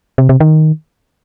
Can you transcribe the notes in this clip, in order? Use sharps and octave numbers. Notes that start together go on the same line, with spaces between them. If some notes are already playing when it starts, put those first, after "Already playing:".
C3
C3
D#3